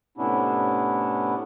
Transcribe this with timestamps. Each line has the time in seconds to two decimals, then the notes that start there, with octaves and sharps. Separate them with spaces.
0.18 A2 C3 B3 C#4 D4 E4